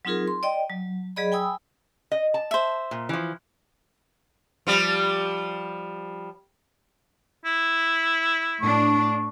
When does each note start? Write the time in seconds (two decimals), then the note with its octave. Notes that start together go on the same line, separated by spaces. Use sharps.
0.05 F#3 C4 D#4 F4 G#4 A#4
0.28 C6
0.43 D5 D#5 G5
0.70 F#3
1.16 F#3 G#4 D5 D#5 B5
1.32 G5 G#5 B5 D#6 E6
2.12 D#5
2.34 A5
2.51 C5 E5
2.91 A#2
3.09 E3 F3
4.67 F3 G3
7.45 E4
8.61 A2 D4 C#6